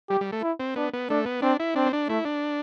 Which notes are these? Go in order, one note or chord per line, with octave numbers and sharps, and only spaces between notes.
G3 G4
G3
A3
E4
C4
B3 D4
B3
A3 D4
B3
C4 D4
E4
C4 D4
C4
D4
A3 E4
D4